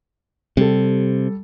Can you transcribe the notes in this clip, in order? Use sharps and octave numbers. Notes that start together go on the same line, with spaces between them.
C3 G3 A4